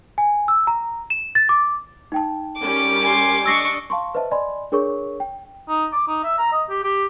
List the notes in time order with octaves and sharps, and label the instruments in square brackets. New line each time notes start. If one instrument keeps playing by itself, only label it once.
[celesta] G#5
E6
A#5
E7
A6
D6
D#4 G5 A5
[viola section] G3 C#4 A#4 [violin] D6
[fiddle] G#5 C6
[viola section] D4 D#5 [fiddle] C#6 [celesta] E6 A#6 C7
[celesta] F5 A5 C6 C#6
B4 C5 D#5 E5 A5
D5 D#5 G#5 B5 C6
D4 G#4 A#4 C#5 C#6
G5
[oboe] D#4
D6
D#4
E5
A#5
D#5
G4
G4